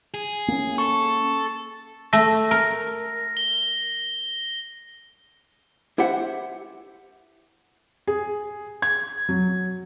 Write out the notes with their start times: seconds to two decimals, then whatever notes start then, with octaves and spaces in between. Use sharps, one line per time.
0.14 G#4
0.48 A#3 C#4
0.78 A4 C#6
2.13 A3 A#6
2.51 A#4
3.37 G7
5.98 E4 G4 C5 E5 F#5
8.07 G#4
8.82 G#6
9.29 F#3